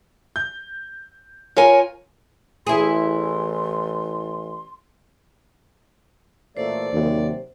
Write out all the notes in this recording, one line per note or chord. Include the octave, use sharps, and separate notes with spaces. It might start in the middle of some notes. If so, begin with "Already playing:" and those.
G6
F4 A#4 C#5 G#5
A1 E4 G#4 C6
A1 A#2 A3 C5 D5
D#2 C3 D#3 F#3